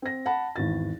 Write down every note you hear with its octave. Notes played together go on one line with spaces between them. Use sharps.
C4 A#6
F#5 A5 B5
G#1 E2 A6